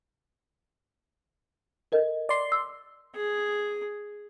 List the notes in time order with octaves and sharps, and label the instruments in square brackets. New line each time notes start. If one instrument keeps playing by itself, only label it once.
[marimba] A4 A#4 D#5
[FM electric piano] D5 C6
[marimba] E6
[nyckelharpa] G#4